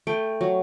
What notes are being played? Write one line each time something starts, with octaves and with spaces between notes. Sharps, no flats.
A3 G5
F#3